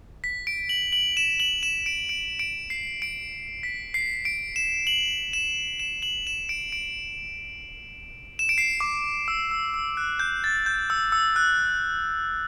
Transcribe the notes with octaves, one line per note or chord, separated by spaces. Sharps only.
B6
D7
F#7
F#7
E7
F#7
E7
D7
D7
D7
C7
D7
B6
C7
D7
E7
F#7
E7
E7
F#7
E7
D7
D7
E7
D7
C7
D6
E6
E6
E6
F#6
G6
A6
G6
E6
E6
F#6